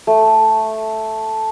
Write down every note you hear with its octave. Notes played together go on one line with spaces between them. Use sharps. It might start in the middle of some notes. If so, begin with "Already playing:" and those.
A3